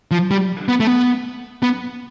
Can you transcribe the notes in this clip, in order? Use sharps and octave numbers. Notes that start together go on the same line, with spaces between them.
F3
G3
B3
A3
B3
B3